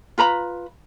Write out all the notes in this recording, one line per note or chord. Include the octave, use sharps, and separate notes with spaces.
F4 B4 A#5 B5